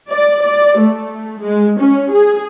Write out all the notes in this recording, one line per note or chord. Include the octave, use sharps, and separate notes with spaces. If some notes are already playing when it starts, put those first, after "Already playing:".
D5
D5
A3
G#3
C#4
G#4